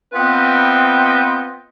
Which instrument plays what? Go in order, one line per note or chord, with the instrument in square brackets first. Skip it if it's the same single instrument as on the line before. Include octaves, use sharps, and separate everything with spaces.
[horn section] B3 C4 F4 B4 D#5 G5